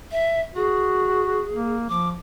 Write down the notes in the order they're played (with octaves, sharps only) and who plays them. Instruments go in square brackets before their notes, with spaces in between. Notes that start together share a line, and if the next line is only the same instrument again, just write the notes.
[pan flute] E5
[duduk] F#4 [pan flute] G#4
[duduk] A#3
[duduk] F3 [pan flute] D6